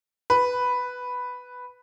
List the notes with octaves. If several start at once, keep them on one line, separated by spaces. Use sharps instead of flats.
B4